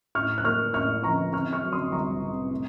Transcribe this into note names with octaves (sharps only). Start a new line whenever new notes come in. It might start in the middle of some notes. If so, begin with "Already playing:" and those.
A2 C#6 F6
F#6
A#3 C#6 F6
A2 C#6 F6
F3 A#5 C#6
C4 C#6 F6
C#6 F6
F#3
C6 D#6
C2 A#5 C#6
C3
A3